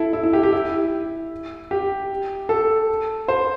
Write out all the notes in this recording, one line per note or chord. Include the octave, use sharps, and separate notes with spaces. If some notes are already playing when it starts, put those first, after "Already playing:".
Already playing: E4 A4
E4
E4
G4
G4
E4
G4
A4
C5